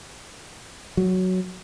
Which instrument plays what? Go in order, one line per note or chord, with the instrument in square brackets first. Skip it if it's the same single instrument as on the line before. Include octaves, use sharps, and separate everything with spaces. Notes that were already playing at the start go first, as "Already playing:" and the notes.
[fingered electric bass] F#3